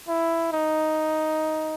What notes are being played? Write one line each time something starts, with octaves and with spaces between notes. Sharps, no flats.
E4
D#4